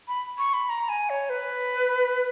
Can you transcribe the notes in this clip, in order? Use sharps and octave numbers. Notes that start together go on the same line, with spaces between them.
B5
C#6
B5
A#5
G#5
C#5
B4